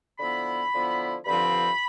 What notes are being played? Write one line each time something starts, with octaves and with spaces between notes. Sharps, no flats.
D3 F3 B3 E4 B5
D3 F3 B3 E4
G2 D3 F3 C4 F4 B5